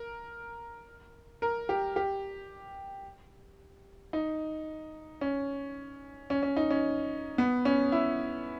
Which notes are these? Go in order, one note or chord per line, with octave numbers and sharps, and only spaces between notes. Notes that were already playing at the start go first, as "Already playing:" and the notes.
Already playing: A#4
A#4
G4
G4
D#4
C#4
C#4
C#4
D#4
C#4
B3
C#4
E4